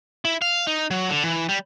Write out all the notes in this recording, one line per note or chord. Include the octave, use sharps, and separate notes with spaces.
E4
F5
D#4
F#3
D3
E3
G3